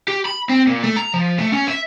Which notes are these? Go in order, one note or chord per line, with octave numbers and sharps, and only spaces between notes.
G4
B5
C4
A#2
A3
A#5
F3
A3
C#4
E5